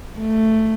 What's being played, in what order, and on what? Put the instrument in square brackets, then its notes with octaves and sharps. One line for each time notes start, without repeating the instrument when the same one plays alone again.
[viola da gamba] A3